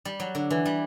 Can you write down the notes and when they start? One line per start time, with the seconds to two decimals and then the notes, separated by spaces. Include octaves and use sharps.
0.05 G3
0.20 F#3
0.35 D3
0.50 E3
0.66 G3